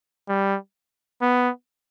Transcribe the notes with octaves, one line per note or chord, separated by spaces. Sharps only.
G3
B3